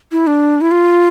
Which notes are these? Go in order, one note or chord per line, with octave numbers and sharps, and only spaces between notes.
E4
D4
E4
F4